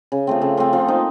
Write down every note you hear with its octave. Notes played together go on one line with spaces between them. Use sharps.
C#3
F3 A3 C4
C#3
F3 A3 C4
F3
A#3 D#4